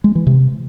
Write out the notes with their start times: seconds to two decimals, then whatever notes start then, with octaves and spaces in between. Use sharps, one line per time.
0.04 G#3
0.15 E3
0.27 C3